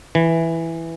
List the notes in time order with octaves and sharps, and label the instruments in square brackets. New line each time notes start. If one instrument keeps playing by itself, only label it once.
[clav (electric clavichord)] E3